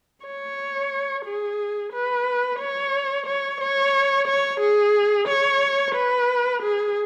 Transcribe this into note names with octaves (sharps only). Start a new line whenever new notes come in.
C#5
G#4
B4
C#5
C#5
C#5
C#5
G#4
C#5
B4
G#4